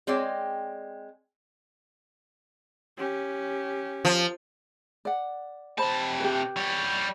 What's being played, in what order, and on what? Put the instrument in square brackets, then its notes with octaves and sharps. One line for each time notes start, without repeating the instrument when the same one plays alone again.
[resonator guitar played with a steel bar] G#3 C4 C#5 D5 G5
[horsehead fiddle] C#4 G4
[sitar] F3
[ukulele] D5 F#5
[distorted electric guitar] C3 A5 [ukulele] C5 B5
[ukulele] G4 B4
[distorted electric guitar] G3 C#5